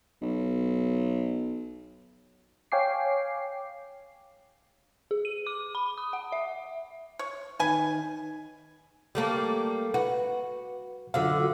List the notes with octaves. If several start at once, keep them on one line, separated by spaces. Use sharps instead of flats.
B1
C#5 F5 G5 G#5 D6 C7
G#4
D#7
D6
B5
D#6
F#5
E5
C#5
D#3 B4 G#5
G3 A3 A#3
F#4 B4
F#2 D3 F4 F#4 F5